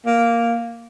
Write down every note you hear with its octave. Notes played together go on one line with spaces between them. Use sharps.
A#3